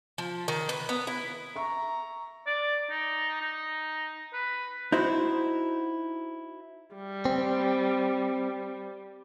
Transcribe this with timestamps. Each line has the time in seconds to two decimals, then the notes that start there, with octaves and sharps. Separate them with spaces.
0.18 F3
0.48 D#3
0.69 B4
0.89 B3
1.07 E4
1.55 E5 A#5 C#6
2.47 D5
2.91 D#4
3.41 D#4
4.33 B4
4.92 D#4 E4 F#4 C5
6.95 G3
7.25 C4